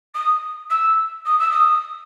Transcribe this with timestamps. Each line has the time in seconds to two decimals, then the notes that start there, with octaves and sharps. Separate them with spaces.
0.14 D#6
0.70 E6
1.25 D#6
1.39 E6
1.51 D#6